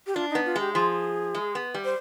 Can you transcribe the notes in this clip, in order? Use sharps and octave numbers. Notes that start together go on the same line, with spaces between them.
G4
D4 F4
B3 D#4
F4
G#3 G4
F3 G#4
G#3
B3
G3
C5